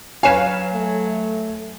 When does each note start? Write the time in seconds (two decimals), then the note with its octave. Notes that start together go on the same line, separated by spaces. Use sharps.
0.23 F#3 B4 C#5 F5 G#5 E7
0.74 A3